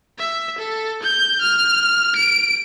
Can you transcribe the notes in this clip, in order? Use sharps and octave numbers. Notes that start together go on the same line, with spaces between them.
E5
A4
G6
F6
D7